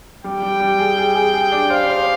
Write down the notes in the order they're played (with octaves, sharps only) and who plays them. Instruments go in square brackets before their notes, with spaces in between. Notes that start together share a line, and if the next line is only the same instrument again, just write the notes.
[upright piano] G3 [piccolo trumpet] G5
[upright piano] G3
G3
G#4
G#4
G#4
G#4
D4
[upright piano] C5 [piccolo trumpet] F5
[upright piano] C5